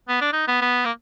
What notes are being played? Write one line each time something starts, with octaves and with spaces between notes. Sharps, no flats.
B3
D4
D#4
B3
B3
A#3